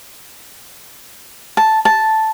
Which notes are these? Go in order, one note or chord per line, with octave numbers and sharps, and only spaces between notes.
A5
A5